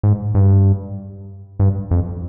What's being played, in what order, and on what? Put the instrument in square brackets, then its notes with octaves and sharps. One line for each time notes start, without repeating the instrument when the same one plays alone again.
[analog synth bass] G#2
G2
G2
F2